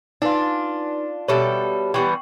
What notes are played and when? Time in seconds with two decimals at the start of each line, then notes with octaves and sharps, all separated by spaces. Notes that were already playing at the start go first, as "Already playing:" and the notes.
0.22 D4 D#4 F4 B4
1.28 B2 G3 A4 C#5 E5
1.94 E3 G3 B3 G5 C#6